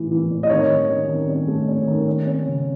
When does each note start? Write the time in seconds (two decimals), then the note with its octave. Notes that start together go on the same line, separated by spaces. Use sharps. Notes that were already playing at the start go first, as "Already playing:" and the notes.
Already playing: A2 E3
0.11 E3
0.31 A2
0.43 D#5
0.50 D#3 C#5
0.70 D#3
0.89 C#4
1.08 D#3
1.28 C#4
1.48 A3
1.68 C#4
1.87 D#3
2.07 C#4
2.26 C#4
2.46 C#3